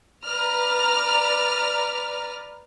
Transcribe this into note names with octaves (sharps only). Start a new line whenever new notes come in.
B4 D5 A#5 F6